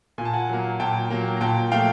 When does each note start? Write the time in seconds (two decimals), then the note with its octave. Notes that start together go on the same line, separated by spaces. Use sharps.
0.18 A#2 G#5
0.25 A5
0.33 F#5 G#5
0.49 F#3 A#3
0.80 A#2 G5 A5
1.10 F#3 A#3
1.37 A#5
1.41 A#2 G5 A5
1.71 F3 A3 F5 G5